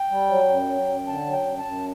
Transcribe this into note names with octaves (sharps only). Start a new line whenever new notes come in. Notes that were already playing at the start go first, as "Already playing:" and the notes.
Already playing: G5
G3
F#3
F#2
F#3
F#2
D3 A5
F#3
G5
F#2
A5
F#2